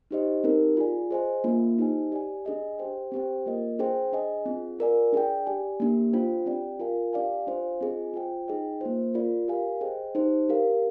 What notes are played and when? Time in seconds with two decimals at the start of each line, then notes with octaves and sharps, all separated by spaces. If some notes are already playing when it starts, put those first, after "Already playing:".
0.11 D#4 G4 C5 D#5
0.44 C4 D#4 G4 A#4
0.77 F4 G#4 D5 G#5
1.11 G#4 C5 D#5 G#5
1.44 A#3 D4 F4
1.78 D#4 G4 C5 D#5 G#5
2.12 G4 D5 G#5
2.45 D4 G#4 D#5 G#5
2.79 G4 C5 G5
3.12 C4 G4 C5 G5
3.46 A#3 F4 A#4 D#5
3.79 D4 G#4 C5 G5
4.12 D4 G#4 D#5 G#5
4.46 C4 F4 G#4
4.79 F4 A#4 D5 F5 G#5
5.13 D4 G#4 D5 G5
5.47 G4 D5 G#5
5.80 A#3 D4 G4
6.13 D4 F4 C5 G5
6.46 C4 G4 D5 G5
6.80 F4 A#4 F5 G#5
7.13 D4 G4 D5 F5 G#5
7.47 D4 F4 C5 F5 G#5
7.81 C4 F4 G#4 D#5 G#5
8.14 F4 C5 G5
8.48 D#4 G#4 D#5 G5
8.81 A#3 F4 C5
9.14 F4 A#4 D5
9.48 G4 A#4 F5 G#5
9.81 G#4 C5 D#5 G5
10.15 D#4 G4 C5
10.49 D4 G4 A#4 F5